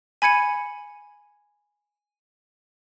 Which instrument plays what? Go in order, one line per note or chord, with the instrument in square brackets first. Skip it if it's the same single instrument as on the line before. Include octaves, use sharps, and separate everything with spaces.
[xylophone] G#5 B5 G#6 C#7 D#7